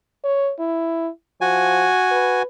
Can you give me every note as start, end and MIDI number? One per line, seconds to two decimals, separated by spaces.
0.24 0.52 73
0.59 1.09 64
1.41 1.89 53
1.41 2.42 66
1.41 2.42 80
2.12 2.45 71